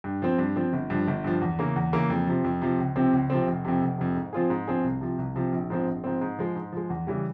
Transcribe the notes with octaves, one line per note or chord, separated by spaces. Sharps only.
G2
F3 C4
G2
F3 C4
G1
G2 F3
G1
G2 F3
E2
C#3 E3 A#3
E2
C#3 E3 A#3
F2
C3 F3
F2
C3 F3
C#2
C3 F3 C4
C#2
C3 F3 C4
F1
F2 C3
F1
F2 C3
G#2
F3 C4 F4 G#4
G#2
F3 C4 F4 G#4
C2
C3 F3
C2
C3 F3
A#1
G#2 F3 C4
A#1
G#2 F3 C4
G#2
F3 G#3
G#2
F3 G#3
E2
C#3 E3 G3